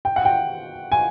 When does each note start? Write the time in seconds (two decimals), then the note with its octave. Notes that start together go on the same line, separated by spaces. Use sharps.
0.05 G5
0.16 F#5
0.25 G5
0.92 G#5